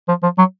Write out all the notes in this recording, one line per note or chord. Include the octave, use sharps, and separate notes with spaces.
F3
F3
F#3